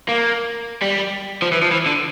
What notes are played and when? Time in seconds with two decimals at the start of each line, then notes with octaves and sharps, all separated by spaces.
0.09 A#3
0.82 G3
1.42 F3
1.52 E3
1.62 F3
1.71 E3
1.86 D3